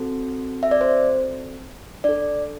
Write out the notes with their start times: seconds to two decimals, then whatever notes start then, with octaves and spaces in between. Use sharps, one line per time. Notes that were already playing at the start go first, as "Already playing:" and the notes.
Already playing: C4 F#4 A4
0.63 E5
0.71 D5
0.81 C5
2.04 D4 A4 D5